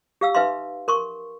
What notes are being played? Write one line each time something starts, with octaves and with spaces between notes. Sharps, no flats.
G4 F5 E6
D#4 B4 E5 F5 C6
A#4 C6 C#6